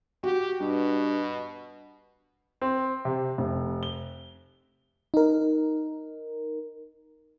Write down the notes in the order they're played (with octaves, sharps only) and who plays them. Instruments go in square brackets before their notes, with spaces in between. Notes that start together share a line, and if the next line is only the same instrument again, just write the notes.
[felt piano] F#4 [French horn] G4
[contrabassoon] G2 [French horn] B2
[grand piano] C4
C3
F1
G7
[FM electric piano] D#4 A#4